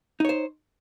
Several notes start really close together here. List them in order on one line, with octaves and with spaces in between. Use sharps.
D#4 C#5 C5